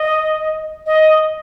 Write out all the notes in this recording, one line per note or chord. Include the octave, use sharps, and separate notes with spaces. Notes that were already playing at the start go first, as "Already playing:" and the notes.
Already playing: D#5
D#5